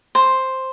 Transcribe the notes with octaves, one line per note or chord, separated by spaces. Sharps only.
C5